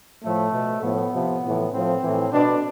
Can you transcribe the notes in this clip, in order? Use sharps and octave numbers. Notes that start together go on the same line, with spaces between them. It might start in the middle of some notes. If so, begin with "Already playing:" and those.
A2 F3 A3
B2
A2 F3 B3
C3 F3
A2 E3
A2 F3 C4
A2 E3
B2 D4